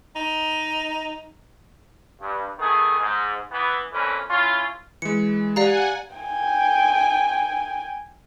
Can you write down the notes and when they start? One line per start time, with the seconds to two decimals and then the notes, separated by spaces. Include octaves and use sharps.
0.16 D#4
2.21 G2
2.59 D#3 A3 B3 G#4
2.99 G#2
3.51 E3 B3
3.93 F2 A#2 E3 C#4 B4
4.30 C#4 E4 F4
5.02 E3 G#3 C#7
5.56 G4 D5 F5 F#5 G#5 A#5
6.16 G5 G#5